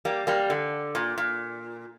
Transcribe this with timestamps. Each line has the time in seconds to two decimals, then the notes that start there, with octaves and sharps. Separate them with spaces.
0.05 G3 A#3
0.27 G3 A#3
0.50 D3
0.95 A#2
1.18 A#2